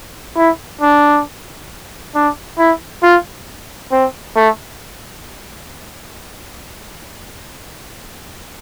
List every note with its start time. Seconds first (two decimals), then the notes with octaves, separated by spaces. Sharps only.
0.37 E4
0.81 D4
2.15 D4
2.58 E4
3.03 F4
3.92 C4
4.36 A3